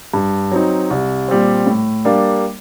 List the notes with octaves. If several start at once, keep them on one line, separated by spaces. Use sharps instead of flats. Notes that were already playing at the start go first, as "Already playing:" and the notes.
G2
F#3 C4 D#4
C2
A#2 G3 C4
A2
G3 A#3 D4